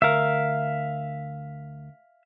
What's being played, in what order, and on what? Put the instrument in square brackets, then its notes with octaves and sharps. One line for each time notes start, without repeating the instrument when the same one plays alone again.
[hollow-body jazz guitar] D2 A#4 [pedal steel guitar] E5 F5